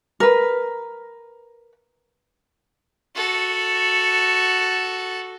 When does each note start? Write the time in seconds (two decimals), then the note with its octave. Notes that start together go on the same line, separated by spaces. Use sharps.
0.20 A#4 B4
3.16 F#4 A4